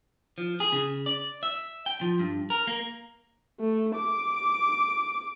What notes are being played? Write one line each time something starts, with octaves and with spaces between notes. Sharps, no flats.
F3
G#4
C#3
D5
E5
G5
F3
G2
A#4
A#3
A3
D6